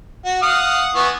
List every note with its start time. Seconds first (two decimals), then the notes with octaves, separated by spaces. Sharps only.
0.25 F#4
0.42 F5 F#5 D#6
0.95 E3 B3 C#6